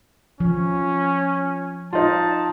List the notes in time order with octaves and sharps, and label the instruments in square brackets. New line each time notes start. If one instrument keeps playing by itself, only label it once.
[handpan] F3 [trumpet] C#4
[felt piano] D#4 F4 [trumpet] A5